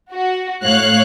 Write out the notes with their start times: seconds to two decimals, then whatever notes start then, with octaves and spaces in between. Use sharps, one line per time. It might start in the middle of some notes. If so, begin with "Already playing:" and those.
0.12 F#4
0.64 A2 C#5 F5 F#6